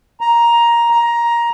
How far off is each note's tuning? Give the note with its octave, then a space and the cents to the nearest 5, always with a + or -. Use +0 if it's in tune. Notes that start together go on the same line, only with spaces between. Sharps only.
A#5 +10
A#5 +15